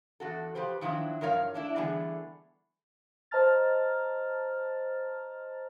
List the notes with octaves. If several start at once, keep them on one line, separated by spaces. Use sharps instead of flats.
E2 F#4 A4
F3 G4 B4 C5
D#3 F3 F#3 D4 E4
G2 F3 A#4 C#5 F5
A3 D4 E4
D3 E3 G3 A3 B3 G#4
C5 D#5 A5 A#5 F6 A6